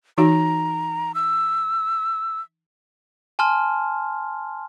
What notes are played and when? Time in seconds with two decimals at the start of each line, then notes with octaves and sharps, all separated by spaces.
0.18 E3 D#4 F#4 A#5
1.15 E6
3.39 G#5 A5 C6 F6